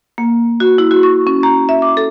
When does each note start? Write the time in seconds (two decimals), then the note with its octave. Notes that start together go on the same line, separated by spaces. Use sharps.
0.18 A#3
0.60 F#4
0.78 E4
0.91 F#4
1.03 C#6
1.27 C#4
1.43 A#5
1.69 E5
1.82 D6
1.97 A4